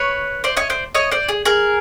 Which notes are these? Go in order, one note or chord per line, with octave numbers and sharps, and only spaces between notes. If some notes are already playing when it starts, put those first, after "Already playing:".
Already playing: B4 C#5
C5 D5
C#5 D#5
C5 D5
C#5 D#5
C5 D5
G#4
G#4 A#4